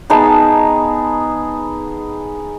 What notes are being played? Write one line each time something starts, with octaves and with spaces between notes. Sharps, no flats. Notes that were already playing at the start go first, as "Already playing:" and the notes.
B3 D#4 G#4 A5